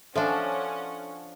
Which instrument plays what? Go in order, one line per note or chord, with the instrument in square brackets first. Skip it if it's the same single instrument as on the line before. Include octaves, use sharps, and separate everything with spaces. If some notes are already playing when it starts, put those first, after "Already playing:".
[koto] F3 D4 [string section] C#4 F#5 [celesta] A4 E5